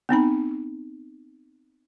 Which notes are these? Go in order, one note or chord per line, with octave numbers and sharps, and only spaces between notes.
B3 C4 D#4 B5